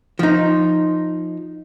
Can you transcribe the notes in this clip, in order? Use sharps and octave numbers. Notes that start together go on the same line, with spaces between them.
F3 D#4